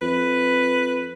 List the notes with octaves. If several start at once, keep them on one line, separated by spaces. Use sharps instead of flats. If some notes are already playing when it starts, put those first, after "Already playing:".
F2 B4